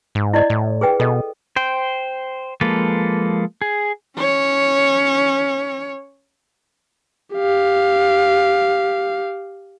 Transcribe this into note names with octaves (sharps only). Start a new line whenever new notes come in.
G#2
E4 D5 D#5
A2
G#4 B4 G5
B2 A4 D#5
C5 G5
F3 G#3 A#3 A4 B4
G#4
C#4 C#5
G4 F5